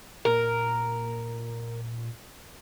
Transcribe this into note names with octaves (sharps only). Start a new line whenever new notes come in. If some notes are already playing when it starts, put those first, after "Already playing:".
A#2 A#4